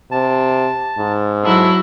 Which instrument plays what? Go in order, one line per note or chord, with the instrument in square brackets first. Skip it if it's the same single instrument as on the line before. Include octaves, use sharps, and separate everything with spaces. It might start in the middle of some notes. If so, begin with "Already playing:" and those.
[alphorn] C3 [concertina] A5
[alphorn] G#2
[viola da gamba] F#3 E4 F#4 [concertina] A4